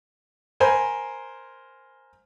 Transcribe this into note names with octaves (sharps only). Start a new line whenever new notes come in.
A#4 C5 G#5 B5